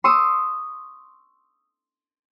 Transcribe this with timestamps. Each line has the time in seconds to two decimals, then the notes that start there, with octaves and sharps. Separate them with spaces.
0.04 C6 C#6 D#6 E6